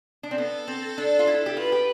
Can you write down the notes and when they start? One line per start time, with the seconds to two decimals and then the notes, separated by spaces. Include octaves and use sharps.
0.23 D4
0.31 C4
0.38 B3 A4
0.68 C4
0.98 D4
1.19 F4
1.27 E4
1.46 G4
1.57 F4 B4
1.72 G4